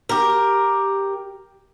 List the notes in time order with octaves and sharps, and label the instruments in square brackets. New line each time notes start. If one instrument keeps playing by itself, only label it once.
[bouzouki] G4 A#4